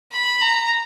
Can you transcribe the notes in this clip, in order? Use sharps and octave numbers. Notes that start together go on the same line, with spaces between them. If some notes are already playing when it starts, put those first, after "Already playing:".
B5
A#5